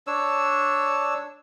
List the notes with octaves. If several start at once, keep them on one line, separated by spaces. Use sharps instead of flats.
D4 C#5 E6